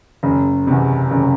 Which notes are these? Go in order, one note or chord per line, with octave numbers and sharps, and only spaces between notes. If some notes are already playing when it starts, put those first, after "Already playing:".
F#1
E2 C3
F#1